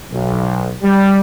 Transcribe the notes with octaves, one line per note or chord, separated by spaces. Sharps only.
B1
G3